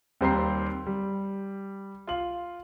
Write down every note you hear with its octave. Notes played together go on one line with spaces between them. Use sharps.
D#2 G3 C4 G4 A#5 C7
G3
F4 F#7